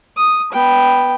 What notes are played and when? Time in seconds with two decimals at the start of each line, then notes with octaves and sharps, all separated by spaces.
0.17 D#6
0.52 B3 G5